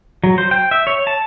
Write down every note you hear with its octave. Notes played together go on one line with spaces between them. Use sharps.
F#3
C5
G5
E5
C#5
A5